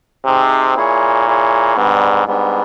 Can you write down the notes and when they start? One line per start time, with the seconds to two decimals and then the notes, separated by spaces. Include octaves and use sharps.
0.26 C3 C4 D#4 G#4
0.76 A#2 E4 G#4 C#5
1.27 E4 G#4 C#5
1.76 G#2 G3 B3 D4
2.27 G#2 G3 B3 D4